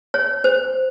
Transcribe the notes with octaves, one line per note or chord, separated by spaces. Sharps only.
C#5
C5